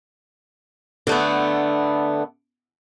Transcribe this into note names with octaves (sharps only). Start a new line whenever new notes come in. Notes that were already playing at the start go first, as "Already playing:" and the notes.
D3 A3 B3